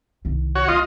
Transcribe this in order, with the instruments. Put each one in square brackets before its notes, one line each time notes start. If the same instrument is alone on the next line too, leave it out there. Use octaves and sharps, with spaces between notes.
[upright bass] C2 D#3
[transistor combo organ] F#4 C#5
[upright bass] C#2 A3 [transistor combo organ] F4 D#5